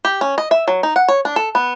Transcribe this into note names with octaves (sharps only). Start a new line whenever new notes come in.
G4
C#4
D#5
E5
F#3
D#4
F#5
C#5
D4
A4
B3